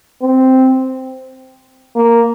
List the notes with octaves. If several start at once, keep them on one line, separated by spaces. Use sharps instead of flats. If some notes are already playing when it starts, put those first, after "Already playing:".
C4
A#3